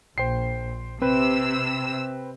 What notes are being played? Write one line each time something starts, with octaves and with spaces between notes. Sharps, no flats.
A#1 C5 G5 C7
C3 C4 B4 E6